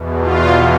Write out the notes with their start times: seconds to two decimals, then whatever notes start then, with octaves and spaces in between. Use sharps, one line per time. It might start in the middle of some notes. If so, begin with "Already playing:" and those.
Already playing: E2 B2
0.22 F4